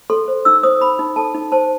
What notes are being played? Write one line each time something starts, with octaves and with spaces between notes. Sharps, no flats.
A4 C6
C5
D#4 E6
C5 D#6
D#4 B5
D#4
A4 A5
D#4
C5 A5